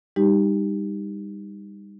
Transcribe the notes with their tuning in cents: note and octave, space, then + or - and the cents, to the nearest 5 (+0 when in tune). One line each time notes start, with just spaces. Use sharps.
G3 +30 D#4 -5 G4 +0